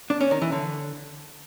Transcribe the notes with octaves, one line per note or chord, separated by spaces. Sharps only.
D4
C#4
D#3
E3
D3